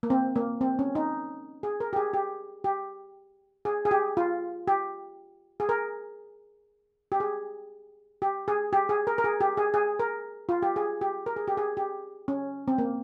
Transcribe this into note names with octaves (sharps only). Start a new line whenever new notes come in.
A#3
C4
A#3
C4
C#4
D#4
G#4
A#4
G4
G#4
G4
G4
G#4
G#4
G4
F4
G4
G#4
A#4
G4
G#4
G4
G#4
G4
G#4
A#4
A#4
G#4
G4
G#4
G#4
A#4
F4
G4
G#4
G4
A#4
G#4
G4
G#4
G4
C#4
C4
A#3